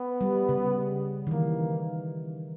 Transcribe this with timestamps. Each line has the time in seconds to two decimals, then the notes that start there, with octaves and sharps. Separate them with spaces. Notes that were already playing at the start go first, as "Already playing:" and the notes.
Already playing: B3
0.21 G3
0.49 C#3
1.27 D#3
1.31 E3 A#3